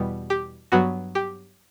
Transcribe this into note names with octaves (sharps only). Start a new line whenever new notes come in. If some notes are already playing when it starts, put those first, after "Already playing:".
Already playing: E2 B2 G3 B3
G4
G2 F#3 B3 F#4
G4